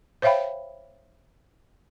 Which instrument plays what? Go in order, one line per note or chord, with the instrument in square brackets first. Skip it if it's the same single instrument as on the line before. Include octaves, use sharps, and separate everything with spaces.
[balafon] C5 C#5 E5 F5 G5 B5